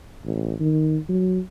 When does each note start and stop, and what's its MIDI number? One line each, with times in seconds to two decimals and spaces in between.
0.25 0.54 33
0.60 0.98 51
1.09 1.40 54